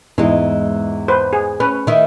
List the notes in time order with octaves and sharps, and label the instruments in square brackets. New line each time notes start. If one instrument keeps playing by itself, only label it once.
[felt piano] E2 G#2 [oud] E3 G#3
[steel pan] B4 C5
G#4
[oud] C#4 [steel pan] B4
[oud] D#3 E4